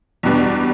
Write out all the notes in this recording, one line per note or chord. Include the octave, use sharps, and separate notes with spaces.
E2 B2 G3 B3 D4